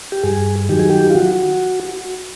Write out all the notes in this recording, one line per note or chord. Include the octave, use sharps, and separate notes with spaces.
G4
G2 G#4
D#3 F#3 G4
G#4
G4
F4
F#4